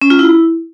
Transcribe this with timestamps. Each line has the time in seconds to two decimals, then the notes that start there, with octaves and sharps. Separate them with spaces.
0.02 C#4
0.10 F4
0.19 E4